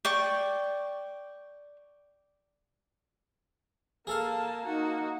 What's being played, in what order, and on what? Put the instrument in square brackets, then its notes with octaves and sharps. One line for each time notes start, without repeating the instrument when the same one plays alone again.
[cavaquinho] D5 G5 C#6
[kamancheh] A#3 A5 [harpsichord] G#4 A4 F5
[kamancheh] A#3 F#4 [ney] D#4